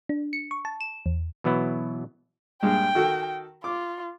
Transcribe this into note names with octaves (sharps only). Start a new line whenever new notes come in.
D4
C#7
C#6
A5
E7
E2
B2 E3 F#3 B3 E4
G2 A#2 G#3 G5
D#3 F#4 A4
F4 D6